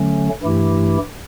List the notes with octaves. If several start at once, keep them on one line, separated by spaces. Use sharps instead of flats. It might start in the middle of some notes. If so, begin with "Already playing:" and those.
Already playing: D3 F#3 A3 C#4
G2 E3 A3 E4 G4